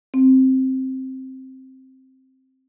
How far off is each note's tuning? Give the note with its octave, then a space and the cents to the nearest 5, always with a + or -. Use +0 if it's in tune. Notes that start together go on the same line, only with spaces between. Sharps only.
C4 +5